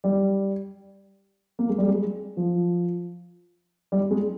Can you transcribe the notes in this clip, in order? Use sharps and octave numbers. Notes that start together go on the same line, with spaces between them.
G3
A#3
G#3
G3
G#3
F3
G3
G#3